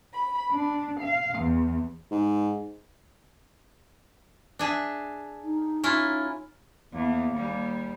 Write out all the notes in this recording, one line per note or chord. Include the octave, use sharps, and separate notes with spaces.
B5
D4
F5
E2
G#2
D4 G#4 E5
D#4
C#4 E4 F4
E2 A#3
D#2 G3